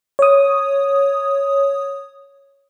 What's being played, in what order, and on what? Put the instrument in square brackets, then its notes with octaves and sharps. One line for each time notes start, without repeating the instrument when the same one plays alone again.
[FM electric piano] C#5 D#6